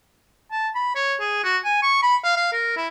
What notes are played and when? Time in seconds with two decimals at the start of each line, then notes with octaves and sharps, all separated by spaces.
0.51 A5
0.75 B5
0.95 C#5
1.20 G#4
1.44 F#4
1.64 G#5
1.83 C#6
2.03 B5
2.24 F5
2.36 F5
2.52 A#4
2.77 E4